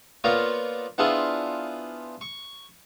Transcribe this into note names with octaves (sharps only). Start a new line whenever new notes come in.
A#3 B3 F4 C#5 D5
B3 D4 E4 F4 G#4 C5
C#6